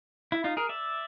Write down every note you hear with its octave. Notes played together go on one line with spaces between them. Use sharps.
E4
D#4 F4
G#4 A#4
D5 E5